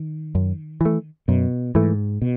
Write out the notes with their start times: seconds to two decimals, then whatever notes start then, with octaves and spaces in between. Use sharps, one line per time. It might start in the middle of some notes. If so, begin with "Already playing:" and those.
Already playing: D#3
0.35 F#2
0.81 E3 A3
1.28 F#2 B2
1.75 G#2 E3 A3
2.22 B2